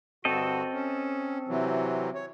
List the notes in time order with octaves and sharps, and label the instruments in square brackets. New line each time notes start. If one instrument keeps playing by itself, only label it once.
[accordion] G2 D3 F#4 [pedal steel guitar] C4 A4 D#5
[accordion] C#4
C3 E3 F#3
C#5